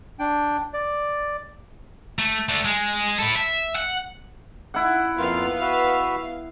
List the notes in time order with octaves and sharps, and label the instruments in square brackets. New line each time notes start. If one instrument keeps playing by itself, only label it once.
[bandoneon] D4 G5
D5
[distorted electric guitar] A3
A3 D4
G#3
E4 A4
E5
F#5
[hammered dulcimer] E4 F#5
[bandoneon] F2 A#3 F4 [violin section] B3 F5
[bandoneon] F#4 B4 E5